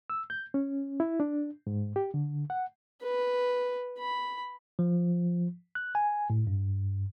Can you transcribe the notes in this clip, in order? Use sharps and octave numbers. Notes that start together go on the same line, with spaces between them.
E6
G6
C#4
E4
D4
G#2
G4
D3
F#5
B4
B5
F3
F#6
G#5
A2
G2